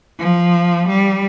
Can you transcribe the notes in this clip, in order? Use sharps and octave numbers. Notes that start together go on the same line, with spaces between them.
F3
G3